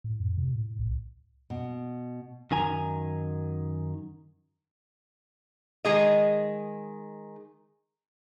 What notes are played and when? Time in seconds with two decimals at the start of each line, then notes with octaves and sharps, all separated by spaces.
0.04 A2
0.20 F2
0.37 C3
0.53 A2
0.79 C2
1.50 B2
2.51 F#2 D#3 G#5 A#5
5.85 D#3 G#3 G#4 D#5